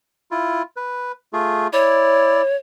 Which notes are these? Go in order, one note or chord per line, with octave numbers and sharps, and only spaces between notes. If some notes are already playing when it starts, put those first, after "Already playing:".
E4 F4
B4
A3 F4 G#4
E4 C#5 D5